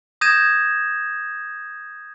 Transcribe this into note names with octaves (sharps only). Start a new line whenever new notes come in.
D#6 G6 G#6 A#6 D#7 E7